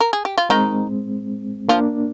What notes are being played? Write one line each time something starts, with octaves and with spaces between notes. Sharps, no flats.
A#4
G#4
G4
F4
D#3 G#3 C4 D#4
F3 A#3 D4 F4